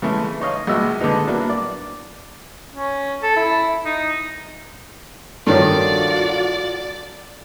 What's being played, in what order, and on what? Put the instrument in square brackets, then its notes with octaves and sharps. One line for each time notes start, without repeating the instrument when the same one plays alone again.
[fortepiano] C#3 E3 G#3 A3
D#4 C#5 D#5 F5
A#1 B2 G#3 D#5 E5 E6
D3 G#3 B3 D#4
F#3 A#3 B3 D4 E4
D5
[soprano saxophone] C#4
A4
E4
D#4
[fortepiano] G2 D#3 F3 [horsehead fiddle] F4 F#4 [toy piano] A4 C#5 [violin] D5